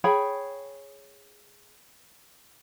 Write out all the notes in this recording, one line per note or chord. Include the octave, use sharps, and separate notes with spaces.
G#4 C#5 G5 B5